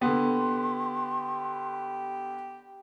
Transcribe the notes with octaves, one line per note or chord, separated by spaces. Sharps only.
D3 B3 G4 C6